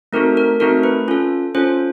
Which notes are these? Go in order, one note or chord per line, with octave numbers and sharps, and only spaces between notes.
A3 C4 D#4 F#4 A4 A#4
A#4
A3 C4 D#4 F#4 A4 A#4
B4
C#4 F4 A4
C#4 F4 A4 C5